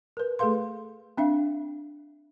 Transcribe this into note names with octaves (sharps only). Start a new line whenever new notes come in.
A#4 B4
A3 G#4 A4 B4 F5 C6
C4 D4 E5 F5